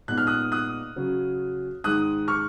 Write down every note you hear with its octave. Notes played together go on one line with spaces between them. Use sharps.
A#2 G#3 B3 D#4 F#6
F6
D#6 F#6
D#6 F#6
C#3 F#3 C#4
G#2 D#3 G#3 D#6 F#6
C#6 F6